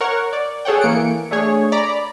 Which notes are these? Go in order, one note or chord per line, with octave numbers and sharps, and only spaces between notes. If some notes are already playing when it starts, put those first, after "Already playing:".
A#4 C#5 F#5 C#6
D5
G#4 A4 C#5 F#5 G5
E3 A#3 C#7 D7
A3 D4 G#4 C#5
D5 A#5 B5 D6